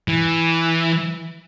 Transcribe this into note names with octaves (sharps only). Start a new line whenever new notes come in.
E3